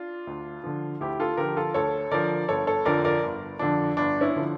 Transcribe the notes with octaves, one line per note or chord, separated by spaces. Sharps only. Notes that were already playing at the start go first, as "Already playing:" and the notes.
Already playing: D4 F4
D2
D3 F3
D2 E4 G4
F4 A4
D3 F3 G4 A#4
F4 A4
D2 A4 C#5
D3 F3 A#4 D5
G1 A4 C#5
A4 C#5
F2 D3 F3 A#4 D5
A#4 D5
G1
F2 D3 F3 D4
G1 D4
C#4 E4
D3 F3